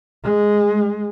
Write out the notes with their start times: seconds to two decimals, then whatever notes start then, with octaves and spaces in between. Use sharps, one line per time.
0.24 G#3